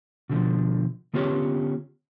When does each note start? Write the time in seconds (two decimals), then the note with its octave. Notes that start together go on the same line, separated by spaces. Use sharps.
0.29 B2 D3 E3 F3
1.14 D3 B3 C#4 F4 G4 C#5